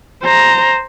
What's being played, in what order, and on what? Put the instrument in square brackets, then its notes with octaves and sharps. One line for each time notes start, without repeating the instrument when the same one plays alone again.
[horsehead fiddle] C5 A#5